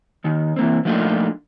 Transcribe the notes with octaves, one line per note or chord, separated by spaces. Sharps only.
D#2 D#3
E3 A#3 C4
F3 A3 A#3 D4 D#4 F4